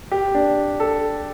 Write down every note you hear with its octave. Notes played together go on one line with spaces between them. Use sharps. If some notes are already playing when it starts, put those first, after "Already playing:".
G4
D4
A4